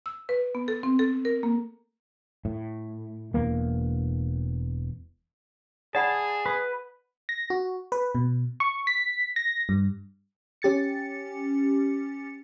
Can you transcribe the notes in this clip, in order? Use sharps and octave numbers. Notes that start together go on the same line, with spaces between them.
E6
B4
B3
A4
C4
A4
A#4
A#3
A2
E1 E2 A#3
G#4 D5 F#5 A5 B5
B4
A#6
F#4
B4
B2
C#6
B6
A#6
G2
C#4 G4 A6 C#7